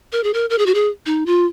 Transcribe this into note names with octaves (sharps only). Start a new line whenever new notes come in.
A#4
G#4
A#4
A#4
G#4
F#4
G#4
D#4
F4